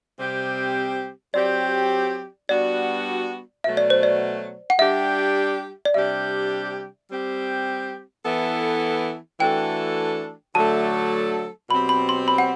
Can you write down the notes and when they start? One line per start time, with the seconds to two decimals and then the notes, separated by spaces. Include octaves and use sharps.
0.19 C3 G3 C4 G4
1.34 F#3 C4 G4 D5
2.49 G3 B3 D4 F#4 D5
3.64 B2 F#3 A3 E5
3.77 D5
3.90 C5
4.03 D5
4.70 F#5
4.79 G3 D4 G4 E5
5.85 D5
5.94 C3 G3 D4 G4 E5
7.09 G3 C4 G4
8.25 E3 B3 E4 A4
9.40 E3 A3 D4 F#4 A4 G5
10.55 D3 F#3 A3 D4 A4 A5
11.70 B2 F#3 C4 G4 B5
11.89 B5
12.09 C6
12.28 B5
12.38 F#5